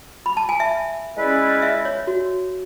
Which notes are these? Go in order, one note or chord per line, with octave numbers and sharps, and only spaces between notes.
B5
A5
G#5
E5
G#3 C#4 E4 B4 D5
E5
C#5
F#4